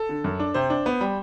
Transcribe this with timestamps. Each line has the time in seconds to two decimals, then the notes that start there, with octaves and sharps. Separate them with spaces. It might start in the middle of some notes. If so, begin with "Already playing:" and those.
Already playing: A4
0.09 D3
0.24 F#2
0.39 D4
0.54 C3 C5
0.70 D4
0.86 B3
1.01 G3